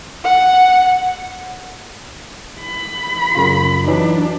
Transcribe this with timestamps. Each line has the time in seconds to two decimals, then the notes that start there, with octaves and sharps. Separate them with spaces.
0.25 F#5
2.60 B5
3.35 F#2 C#3 F4
3.87 E3 F#3 D4 D#4